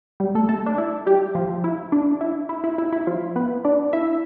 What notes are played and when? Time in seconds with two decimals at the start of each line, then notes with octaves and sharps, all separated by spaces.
0.20 G3 G4
0.35 A3 A4
0.49 A3 A4
0.66 D4
0.78 E4
1.06 G3 G4
1.35 F3 F4
1.64 E4
1.92 D4
2.21 E4
2.49 E4
2.64 E4
2.78 E4
2.92 E4
3.07 F3 F4
3.36 B3 B4
3.65 D4 D5
3.93 E4 E5